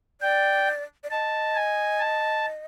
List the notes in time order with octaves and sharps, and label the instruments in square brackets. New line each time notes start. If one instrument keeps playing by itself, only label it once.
[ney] D5 [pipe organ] G5
[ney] D5
[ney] D#5 [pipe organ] A5
[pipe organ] G#5
A5